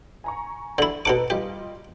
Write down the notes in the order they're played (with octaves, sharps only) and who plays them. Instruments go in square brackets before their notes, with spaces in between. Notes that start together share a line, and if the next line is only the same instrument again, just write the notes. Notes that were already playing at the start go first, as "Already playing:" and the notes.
[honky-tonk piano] G#5 A#5 C#6
[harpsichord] D3 E4
[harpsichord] B2 F#5 D6 [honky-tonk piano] D#4 A4 B4
[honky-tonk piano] G3 F4 D#5 [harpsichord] G4